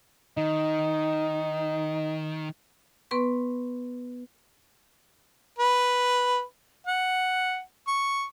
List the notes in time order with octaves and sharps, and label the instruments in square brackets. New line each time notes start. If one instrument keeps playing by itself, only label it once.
[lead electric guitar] D#3 [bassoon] D#4
[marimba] B3 B4 C6 C#6
[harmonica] B4
F#5
C#6